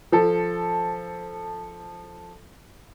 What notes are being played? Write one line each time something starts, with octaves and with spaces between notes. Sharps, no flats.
F3 A4